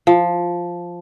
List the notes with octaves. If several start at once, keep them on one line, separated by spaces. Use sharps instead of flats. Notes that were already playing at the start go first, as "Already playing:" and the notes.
F3